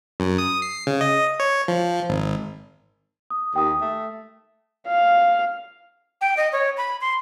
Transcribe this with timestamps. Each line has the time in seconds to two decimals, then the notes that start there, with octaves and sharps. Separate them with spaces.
0.20 F#2
0.38 D#6
0.62 C7
0.87 C#3
1.01 D#5
1.40 C#5
1.68 F3
2.09 G#1
3.30 D#6
3.56 D#2 G5 D#6
3.81 A3
4.88 F5
6.21 G5
6.37 D#5
6.52 C#5
6.77 B5
7.01 C6